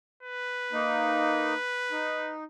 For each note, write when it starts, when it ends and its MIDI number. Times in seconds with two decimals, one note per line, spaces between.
0.23 2.35 71
0.72 1.54 58
0.72 1.54 63
1.91 2.44 63